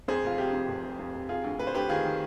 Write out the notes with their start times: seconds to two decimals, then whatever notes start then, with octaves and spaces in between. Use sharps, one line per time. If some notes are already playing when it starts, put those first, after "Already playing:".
0.08 F2 G#4 C5
0.24 F1 F4
0.38 C3 G4
0.53 F2
0.68 F1
0.83 C3
0.99 F2
1.14 F1
1.29 C3 F4 G#4
1.44 D2
1.59 D2 B4
1.67 C5
1.74 D2 G4 B4
1.89 D#3 F4 G#4
2.05 D#3